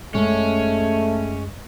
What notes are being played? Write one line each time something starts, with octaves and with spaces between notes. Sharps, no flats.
F#2 G#3 A3 C#4